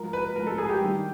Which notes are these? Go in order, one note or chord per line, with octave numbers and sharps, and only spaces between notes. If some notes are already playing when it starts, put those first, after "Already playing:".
Already playing: G#2 F3 A#4
B4
G#2 F3 A#4
A4
G#4
G4
G2 D#3